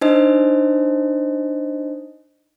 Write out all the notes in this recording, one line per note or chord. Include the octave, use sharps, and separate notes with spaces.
D4 D#4 C5 D#5